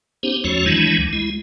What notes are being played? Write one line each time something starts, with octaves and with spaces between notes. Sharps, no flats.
B3 C#4 D#4 G4 C5
E2 F3 A3 C#4 F#4 C#5
D#3 E3 F#3 G#3 D4 E4
D2
G#3 E4